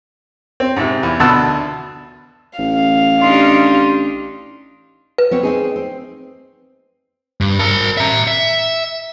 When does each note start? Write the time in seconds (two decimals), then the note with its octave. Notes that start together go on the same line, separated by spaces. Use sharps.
0.60 C4
0.76 G#2 C3
1.03 E2
1.20 D2 B2 A5 E6 F#6
2.58 A1 F5
3.21 D4 D#4 G4 C6
5.18 B4
5.31 B3 C4 C#5
5.43 C4 D#4 G#4
5.76 C4
7.41 G2
7.59 A#4 A5
7.97 E5 A#5
8.27 E5